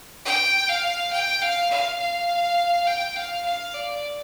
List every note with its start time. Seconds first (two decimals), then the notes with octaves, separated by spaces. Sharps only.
0.25 G5
0.68 F5
1.12 G5
1.41 F5
1.70 F5
1.99 F5
2.87 G5
3.16 F5
3.45 F5
3.74 D5